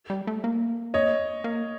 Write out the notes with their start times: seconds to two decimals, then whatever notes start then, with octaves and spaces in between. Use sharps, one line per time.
0.10 G3
0.27 A3
0.44 A#3
0.94 C#5 D#5
1.44 A#3